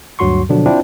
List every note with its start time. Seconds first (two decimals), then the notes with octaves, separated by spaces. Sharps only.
0.19 D2 G2 F#3 F#4 C6 C#6
0.49 B2 D3 F3 F#3 D4
0.66 C4 D4 E4 F4 C5 G5